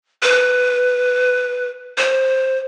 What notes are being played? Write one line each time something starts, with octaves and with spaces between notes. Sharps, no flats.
B4
C5